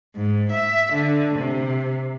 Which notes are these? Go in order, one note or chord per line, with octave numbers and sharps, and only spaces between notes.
G#2
E5
D3
C3